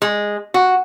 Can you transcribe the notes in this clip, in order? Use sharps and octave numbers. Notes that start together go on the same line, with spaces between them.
G#3
F#4